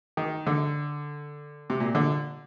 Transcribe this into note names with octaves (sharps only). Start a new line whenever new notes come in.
D#3
D3
C3
A#2
D3